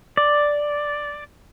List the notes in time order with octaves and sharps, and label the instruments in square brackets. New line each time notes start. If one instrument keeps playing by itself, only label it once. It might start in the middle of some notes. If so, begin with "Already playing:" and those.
[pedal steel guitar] D5